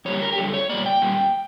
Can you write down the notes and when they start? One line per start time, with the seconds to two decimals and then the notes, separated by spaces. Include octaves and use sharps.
0.05 F2 D3 G3 A#3 C#5
0.22 A#4
0.33 G4
0.38 F2 D3 G3 A4
0.54 C#5
0.69 A#2 G3 A#3 D5
0.86 G5
1.02 A#2 G3 A#3